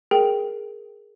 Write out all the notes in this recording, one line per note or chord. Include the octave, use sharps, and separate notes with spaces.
G#4 A#4 G5